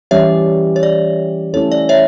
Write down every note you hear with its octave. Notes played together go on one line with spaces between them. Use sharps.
E3 G3 C#4 G4 C#5 E5
C#5
D5
A3 C#4 E4 A4 C#5
D5
C#5 E5